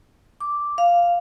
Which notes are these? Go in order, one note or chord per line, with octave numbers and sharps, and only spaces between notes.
D6
F5